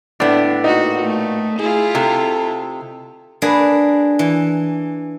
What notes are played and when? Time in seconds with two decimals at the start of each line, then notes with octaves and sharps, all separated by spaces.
0.20 A2 B3 D4
0.64 A#2 D#4 F#4
1.02 A3
1.59 E4 F4 G#4
1.95 C3 A4
3.42 A#3 D4 G#4 B4
4.19 E3